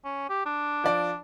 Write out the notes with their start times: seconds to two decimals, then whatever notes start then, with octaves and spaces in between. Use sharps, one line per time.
0.05 C#4
0.30 G4
0.46 D4
0.84 F3 D5